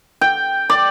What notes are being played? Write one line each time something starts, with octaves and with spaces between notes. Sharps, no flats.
G5
D5